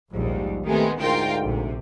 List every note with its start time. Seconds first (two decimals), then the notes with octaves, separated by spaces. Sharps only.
0.13 A#1 D#2 G#2 F3 G3
0.67 D#3 G#3 A3 B3 C4 G4
1.00 D2 G#2 F4 A#4 G5
1.42 A#1 C3